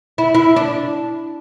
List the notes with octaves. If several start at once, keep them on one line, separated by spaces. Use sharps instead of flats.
E4
E4
D4